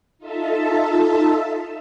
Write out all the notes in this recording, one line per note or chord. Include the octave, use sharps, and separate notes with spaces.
D#4 F4 A4 E5 A5